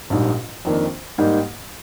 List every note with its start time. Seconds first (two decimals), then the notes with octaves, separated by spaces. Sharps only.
0.10 A#1 G#2 G3
0.65 F2 D#3 A#3 D4
1.18 G#2 G3 A#3 D#4